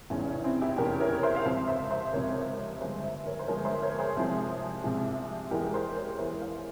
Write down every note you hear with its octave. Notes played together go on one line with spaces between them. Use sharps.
F1 E2 C#3 E3 C#4
C#4
C4 E4
E4 G4
F1 E2 C#3 E3 G4 A#4
A#4 C#5
C5 E5
F5
C#2 C3 F3 C5 E5
C5 E5
C5 E5
C#2 C3 F3 A#4 C#5
G1 G2 F3 G#3 C5 E5
C5 E5
A#4 C#5
C5
G1 G2 F3 G#3 A#4 C#5
C5 E5
A#4 C#5
G#4 C5
C2 C3 F3 G#3
C2 C3 F3 G#3
E2 E3 G#3 G4 A#4
G#4 C5
A#4 C#5
E2 E3 G#3 C5 E5
C#5 F5